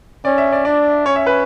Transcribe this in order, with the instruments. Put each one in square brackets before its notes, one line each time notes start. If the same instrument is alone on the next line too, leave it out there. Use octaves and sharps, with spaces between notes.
[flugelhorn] C#4 [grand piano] D5
[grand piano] E5
D5
[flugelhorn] D4 [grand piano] D5
[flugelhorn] C#4 [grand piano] C#5
[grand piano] E5
B4